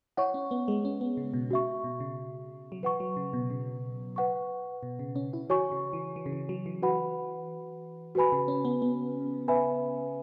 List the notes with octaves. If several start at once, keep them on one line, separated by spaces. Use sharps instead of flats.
E4 C#5 F#5 C#6
C#4
B3
G#3
C#4
B3
C#3
B2
C#3 F#4 E5 C#6
B2
C#3
F#3
E3 B4 F#5 C#6
F#3
C#3
B2
C#3
B4 F#5 C#6
B2
C#3
C#4
E4
E3 F#4 C#5 G#5 C#6
C#3
E3
E3
C#3
E3
F#3
E3
F#4 B4 F#5 B5
E3 F#4 B4 G#5 B5
C#3
C#4
B3
B3
B4 E5 G#5 B5